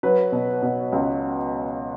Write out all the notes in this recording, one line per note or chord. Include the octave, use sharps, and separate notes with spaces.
F#3 B4
B2
B2
C#2